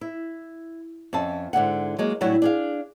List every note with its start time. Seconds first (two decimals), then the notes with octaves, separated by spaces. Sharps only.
0.01 E4
1.13 F2 C#4 E5 A5
1.53 G#2 D3 E4 F#5
1.99 F#3 G#3 A#3
2.21 A2 F#3 G3 D4 E4 F#5
2.42 D4 G#4 F5